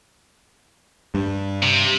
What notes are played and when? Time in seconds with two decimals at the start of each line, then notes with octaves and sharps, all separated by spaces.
1.15 G2
1.62 C3